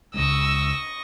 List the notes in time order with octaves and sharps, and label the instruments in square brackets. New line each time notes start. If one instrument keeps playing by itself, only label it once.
[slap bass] C#2 G#3 [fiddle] D#5 C#6 [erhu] E6